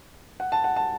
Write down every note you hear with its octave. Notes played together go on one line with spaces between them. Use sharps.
F#5
A5
F#5
A5